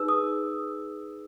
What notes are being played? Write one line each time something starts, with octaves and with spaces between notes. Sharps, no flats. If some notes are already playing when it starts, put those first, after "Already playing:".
Already playing: D#4 G#4 B4 E6
D#6